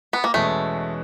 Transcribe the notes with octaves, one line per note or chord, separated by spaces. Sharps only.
B3
A#3
E2 B2 G#3 A3 C#4